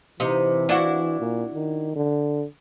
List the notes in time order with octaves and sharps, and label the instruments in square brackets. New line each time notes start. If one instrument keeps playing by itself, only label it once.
[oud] C3 D#4 [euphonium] E3
[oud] D4 E4 F#4
[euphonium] A#2
D#3
D3